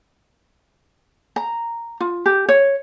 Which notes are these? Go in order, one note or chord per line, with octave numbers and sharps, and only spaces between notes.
A#5
F4
G4
C#5